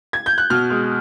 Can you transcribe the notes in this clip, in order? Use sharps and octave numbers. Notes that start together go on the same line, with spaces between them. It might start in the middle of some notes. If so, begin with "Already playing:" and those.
G#6
G6
F#6
B2 F6
G#3